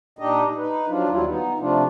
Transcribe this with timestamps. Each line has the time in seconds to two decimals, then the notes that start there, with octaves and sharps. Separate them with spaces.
0.19 A#2 D4 D#4 G4 D#5
0.57 D#4 B4
0.88 F3 F#3 D4 F4
1.09 D#2 F#3 G3 E4 F4
1.26 B3 D#4
1.60 C3 F3 A3 D4 F4